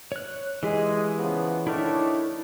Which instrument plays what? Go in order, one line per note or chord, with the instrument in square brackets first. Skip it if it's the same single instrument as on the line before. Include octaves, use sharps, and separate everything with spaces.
[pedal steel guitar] C#5 F#6
[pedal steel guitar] E3 G4 G#4 [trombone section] G#3
[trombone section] C#3 F3 B3
[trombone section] D#3 A3 D4 [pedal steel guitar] E4 A#4 C#5